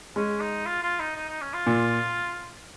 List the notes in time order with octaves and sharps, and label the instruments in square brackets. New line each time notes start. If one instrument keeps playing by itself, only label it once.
[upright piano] G#3 [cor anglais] C#4
[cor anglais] D#4
F4
F4
D#4
D#4
D#4
C#4
F4
[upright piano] A#2